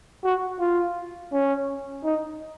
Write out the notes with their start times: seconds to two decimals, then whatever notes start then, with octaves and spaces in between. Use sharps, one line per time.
0.24 F#4
0.59 F4
1.32 C#4
2.04 D#4